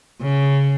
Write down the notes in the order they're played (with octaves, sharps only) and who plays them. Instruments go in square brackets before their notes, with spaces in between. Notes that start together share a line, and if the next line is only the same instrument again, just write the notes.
[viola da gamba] C#3